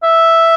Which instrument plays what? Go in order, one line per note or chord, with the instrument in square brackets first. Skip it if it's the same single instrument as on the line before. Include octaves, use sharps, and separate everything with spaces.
[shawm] E5